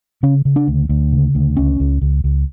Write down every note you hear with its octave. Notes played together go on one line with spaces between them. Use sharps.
C#3 C#4
C#3
D4
D2
D2
C#3
D2
C#2 C#4
C#2
C#2
C#2